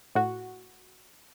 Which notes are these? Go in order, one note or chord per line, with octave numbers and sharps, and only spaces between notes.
A2 F#4